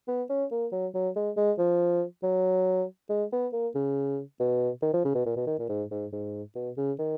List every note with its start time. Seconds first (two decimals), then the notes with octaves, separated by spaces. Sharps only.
0.08 B3
0.30 C#4
0.51 A#3
0.72 F#3
0.95 F#3
1.16 G#3
1.37 G#3
1.58 F3
2.23 F#3
3.10 G#3
3.32 B3
3.53 A#3
3.75 C#3
4.40 B2
4.82 D#3
4.94 F3
5.05 C#3
5.15 B2
5.26 A#2
5.37 B2
5.47 D#3
5.59 A#2
5.69 G#2
5.91 G#2
6.12 G#2
6.55 B2
6.77 C#3
6.99 D#3